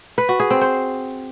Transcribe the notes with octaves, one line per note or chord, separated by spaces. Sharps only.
B4
F#4
G#4
C4
C5